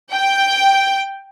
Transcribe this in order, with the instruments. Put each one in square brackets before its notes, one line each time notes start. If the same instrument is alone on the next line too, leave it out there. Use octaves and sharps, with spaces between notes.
[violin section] G5